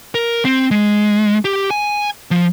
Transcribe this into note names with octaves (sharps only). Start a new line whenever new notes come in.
A#4
C4
G#3
G4
G#5
F3